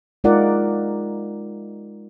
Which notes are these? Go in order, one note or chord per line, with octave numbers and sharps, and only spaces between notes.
G#3 D#4 F4 A#4 D5 F#5